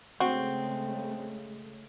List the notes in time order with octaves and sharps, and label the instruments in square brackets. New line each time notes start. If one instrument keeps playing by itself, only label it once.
[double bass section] C#3 G#3 A3 [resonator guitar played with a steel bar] C4 [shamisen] F#4